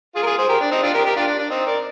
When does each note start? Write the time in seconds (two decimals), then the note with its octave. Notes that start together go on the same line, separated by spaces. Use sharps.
0.15 F4 G#4
0.23 A#4
0.26 F4 G#4
0.38 G#4 C5
0.49 G4 A#4
0.60 D4
0.71 C4 D#4
0.83 D4 F4
0.93 G4 A#4
1.05 G4 A#4
1.16 D4 F4
1.27 D4
1.38 D4
1.50 C4 D#4
1.66 A#4 D5